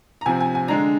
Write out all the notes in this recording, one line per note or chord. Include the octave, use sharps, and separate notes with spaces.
A#5
C3 F3 C4 G#5
G#5
G#5
D3 G#3 D4 A#5